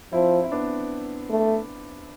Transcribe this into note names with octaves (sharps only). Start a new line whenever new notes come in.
F3 C4 E4
E4
B3 D4
A3